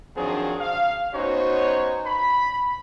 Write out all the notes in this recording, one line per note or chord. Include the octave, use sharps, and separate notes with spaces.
D#3 F3 F#3 C4 D4 G#4
F5
B3 C#4 D#4 F#4 C5 C#5
B5